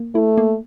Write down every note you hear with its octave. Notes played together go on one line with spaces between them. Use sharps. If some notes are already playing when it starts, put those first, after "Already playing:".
Already playing: A#3
A3 E4
A#3